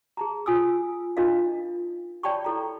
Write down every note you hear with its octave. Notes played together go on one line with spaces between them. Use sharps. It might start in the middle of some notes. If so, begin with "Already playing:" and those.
G#4 A5 A#5
F4 G#5 D#6 E6
D4 D#4 F4 A#4 D#5 F5
C#5 D5 G5 A5 B5 C#6
E4 A4 A#5